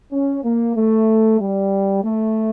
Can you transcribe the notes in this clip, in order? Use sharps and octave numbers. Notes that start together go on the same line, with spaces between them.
C#4
A#3
A3
G3
A3